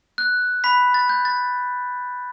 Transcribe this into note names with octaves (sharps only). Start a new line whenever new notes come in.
F#6
B5 B6
A6
G6
A6